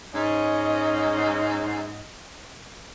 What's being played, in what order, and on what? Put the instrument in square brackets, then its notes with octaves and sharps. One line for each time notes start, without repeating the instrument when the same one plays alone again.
[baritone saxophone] G#2 [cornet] C#4 [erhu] D#5